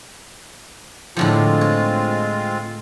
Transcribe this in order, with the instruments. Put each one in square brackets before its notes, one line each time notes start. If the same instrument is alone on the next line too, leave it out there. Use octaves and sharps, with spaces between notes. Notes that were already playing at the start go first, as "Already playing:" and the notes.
[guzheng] A2 D3 F3 [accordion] G#3 C4 F4
[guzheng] C#5